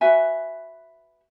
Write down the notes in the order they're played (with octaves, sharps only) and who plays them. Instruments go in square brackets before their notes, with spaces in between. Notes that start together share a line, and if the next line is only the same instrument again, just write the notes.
[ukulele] F#4 B4 E5 G#5